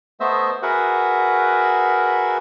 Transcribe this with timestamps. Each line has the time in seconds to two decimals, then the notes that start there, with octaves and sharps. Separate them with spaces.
0.20 A3 B3 C5 D#5 E5 E6
0.62 F#4 G#4 A#4 B4 E5 F#5